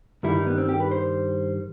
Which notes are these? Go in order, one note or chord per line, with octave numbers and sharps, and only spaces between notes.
G2 D#3 G3 E4
D#4
B3
C4
G4
B4
C5